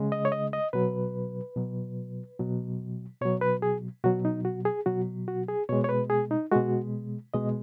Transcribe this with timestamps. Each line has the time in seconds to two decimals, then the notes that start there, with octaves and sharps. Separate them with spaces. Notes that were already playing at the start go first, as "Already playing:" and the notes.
Already playing: C#3 G#3
0.12 D#5
0.25 C#5
0.32 D#5
0.53 D#5
0.73 B2 F#3 B4
1.56 B2 F#3
2.39 B2 F#3
3.22 B2 F#3 C#5
3.41 B4
3.62 G#4
4.04 B2 F#3 F#4
4.25 D#4
4.45 F#4
4.65 G#4
4.86 B2 F#3 F#4
5.28 F#4
5.48 G#4
5.69 B2 G#3 C#5
5.84 C#5
5.89 B4
6.10 G#4
6.31 D#4
6.52 B2 G#3 F#4
7.34 B2 G#3 D#5